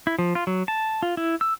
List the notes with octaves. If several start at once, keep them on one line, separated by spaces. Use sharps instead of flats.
E4
F3
F4
F#3
A5
F4
E4
E6